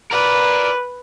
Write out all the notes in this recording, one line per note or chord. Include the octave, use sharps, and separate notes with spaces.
A#4 B4 D5